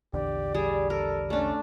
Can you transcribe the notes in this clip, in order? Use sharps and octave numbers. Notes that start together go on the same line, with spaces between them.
A#1 E2 D3 G4 D5
G3 G#4
A4 A#4
A3 C#4 D4 D5